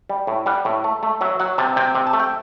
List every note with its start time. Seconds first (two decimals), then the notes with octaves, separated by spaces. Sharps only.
0.09 G3
0.27 A2
0.46 G3 F#5
0.65 A2
0.84 A3
1.03 A3
1.21 F#3 E5
1.40 F#3 F#5
1.58 C3 A5
1.76 C3 G5
1.95 C3
2.07 A5
2.13 A3
2.20 G5